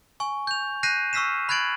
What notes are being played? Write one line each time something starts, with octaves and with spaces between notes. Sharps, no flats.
G#5 C#6
G6 F7
F#6 G6 A#6 C7 D#7
C#6 E6 F6 B6 C7 E7
B5 F#6 G#6 A6 D7 F#7